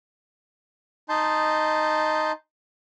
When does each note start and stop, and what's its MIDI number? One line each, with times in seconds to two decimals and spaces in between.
1.09 2.32 63
1.09 2.32 75
1.09 2.32 81
1.09 2.32 84
1.09 2.32 91